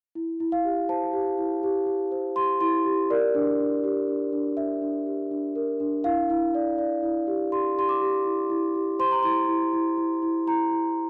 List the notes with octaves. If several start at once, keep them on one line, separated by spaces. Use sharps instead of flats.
E4
E4
F5
G4
C5 A5
G4
E4
G4
G4
C5
G4 C6
E4 C6
G4
A#4 D5
D4
D4
G4
D4
D4
D4 E5
D4
G4
D4
A#4
D4
E4 F5
E4
D5
D5
E4
G4
G4 C6
G4 C6
D6
G4
E4
E4
G4
C5 C6
A#5
E4 C6
E4
E4
E4
E4
E4 A#5
E4